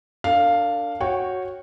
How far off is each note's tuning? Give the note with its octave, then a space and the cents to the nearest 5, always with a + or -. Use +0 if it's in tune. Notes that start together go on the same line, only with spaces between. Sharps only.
D4 +0 A#4 -45 F5 +0
F#4 +0 C#5 -10 G5 +0